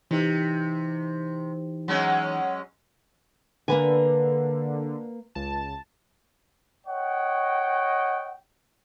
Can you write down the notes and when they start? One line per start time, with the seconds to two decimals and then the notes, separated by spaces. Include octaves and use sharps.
0.11 C3 E3 D#4
1.88 F#3 G#3 C#4
3.68 D3 A#3 B4 G#5
5.35 C#2 A5
6.87 C#5 D#5 F#5 G5